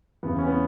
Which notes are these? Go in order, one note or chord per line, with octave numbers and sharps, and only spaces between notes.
E2 C#3 E3 B3
C#4
B3